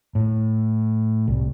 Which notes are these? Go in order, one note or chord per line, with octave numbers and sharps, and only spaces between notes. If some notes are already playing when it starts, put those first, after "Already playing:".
A2
C2